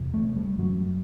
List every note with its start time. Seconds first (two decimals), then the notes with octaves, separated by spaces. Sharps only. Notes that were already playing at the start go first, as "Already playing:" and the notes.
Already playing: E2 C3
0.14 A3
0.36 G3
0.58 F#2 F#3